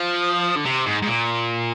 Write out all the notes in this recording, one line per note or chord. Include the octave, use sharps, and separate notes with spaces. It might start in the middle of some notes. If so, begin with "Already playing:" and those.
Already playing: F3
D3
C3
G#2
G#2
A#2